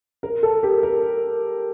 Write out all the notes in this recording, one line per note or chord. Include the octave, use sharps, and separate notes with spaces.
A#4
A4
G4
A#4